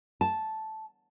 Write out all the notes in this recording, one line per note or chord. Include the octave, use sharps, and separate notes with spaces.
A5